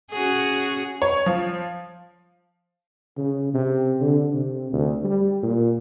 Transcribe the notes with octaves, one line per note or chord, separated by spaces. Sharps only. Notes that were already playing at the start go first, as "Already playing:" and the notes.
C#4 F#4 G#4
C#5
F3
C#3
C3
D3
C3
D2
G3
A#2